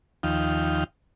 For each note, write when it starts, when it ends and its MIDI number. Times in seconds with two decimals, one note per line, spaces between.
0.23 0.84 39
0.23 0.84 53
0.23 0.84 63
0.23 0.84 77
0.23 0.84 79